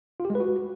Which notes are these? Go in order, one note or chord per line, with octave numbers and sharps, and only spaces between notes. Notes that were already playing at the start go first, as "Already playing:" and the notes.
F4
G4
G#3
B4
F#4